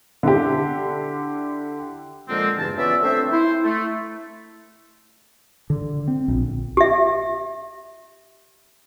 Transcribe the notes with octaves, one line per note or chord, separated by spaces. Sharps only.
D3 E4 G4
A#2 D3 F3 G#3 A#3 C4
E2 G2 C#3 E3 A5
B3 C#4 F4 D5 E5
A3 C4 D4 C5 E5
E4 C5
A3
D3
C4
A#1
G4 E5